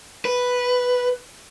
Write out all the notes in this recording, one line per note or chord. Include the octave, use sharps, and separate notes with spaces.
B4